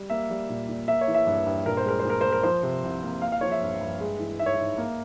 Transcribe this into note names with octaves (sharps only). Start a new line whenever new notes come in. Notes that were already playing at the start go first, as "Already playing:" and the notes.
Already playing: G3
A#3 E5
G3
A#2
A#2
A#3 E5
C#5
E3
E5
G2
G2
A#2 A#4
C5
G#3 A#4
C5
A#2
A#4
G#3 C5
A#4
F3 C5
C3
C2
A#3
A#3 F5
F5
F3 C#5
E5
G2
G2
G#3
E3
G#2 E5
C#5
G#2 E5
A#3